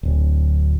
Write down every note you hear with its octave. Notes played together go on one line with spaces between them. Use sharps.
D1